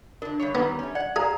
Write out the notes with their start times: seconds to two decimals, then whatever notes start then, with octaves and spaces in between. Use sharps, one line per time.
0.22 D3 D4 A#4
0.40 G2 D3 C#5
0.55 D#3 G3 B3
0.79 A3 C#4
0.95 D5 F#5
1.16 G#4 D5 F5 A#5